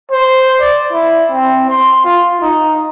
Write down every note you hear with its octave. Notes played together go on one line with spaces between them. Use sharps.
C5
D5
E4
C4
C6
F4
D#4